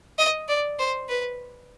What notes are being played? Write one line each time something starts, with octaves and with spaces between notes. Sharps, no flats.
D#5
D5
C5
B4